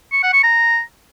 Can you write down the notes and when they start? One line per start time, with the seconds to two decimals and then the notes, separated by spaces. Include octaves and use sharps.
0.13 C#6
0.23 F#5
0.33 C#6
0.43 A#5